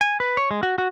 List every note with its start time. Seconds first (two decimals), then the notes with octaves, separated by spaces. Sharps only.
0.01 G#5
0.20 B4
0.37 C#5
0.51 G#3
0.63 F#4
0.78 F#4